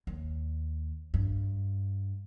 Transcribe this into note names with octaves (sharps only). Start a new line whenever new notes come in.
D#2
G2